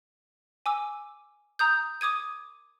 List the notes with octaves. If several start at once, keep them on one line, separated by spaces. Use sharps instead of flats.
G#5 D6 E6
A#5 D#6 G6
D6 D#6 G#6 D#7